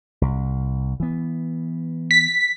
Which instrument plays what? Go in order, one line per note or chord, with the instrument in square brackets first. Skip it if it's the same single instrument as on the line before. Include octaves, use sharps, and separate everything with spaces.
[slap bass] C2
E3 B3
[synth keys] B6